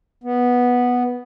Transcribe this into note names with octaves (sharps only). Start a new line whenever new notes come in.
B3